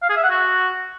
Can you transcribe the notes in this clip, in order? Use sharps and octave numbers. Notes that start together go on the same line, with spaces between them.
F5
G#4
E5
F#5
F#4